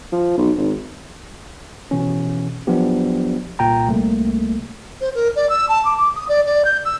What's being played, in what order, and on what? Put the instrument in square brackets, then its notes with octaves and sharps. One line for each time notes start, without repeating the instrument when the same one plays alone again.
[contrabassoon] F3
B1
G#1
[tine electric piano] B2 E3 C#4
F3 F#3 B3 D4 G4
C2 A#2 G5 A#5
C2 A3 A#3
[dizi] C5
A#4
D5
E6
A5
D6
D6
D#6
D5
D5
G6
E6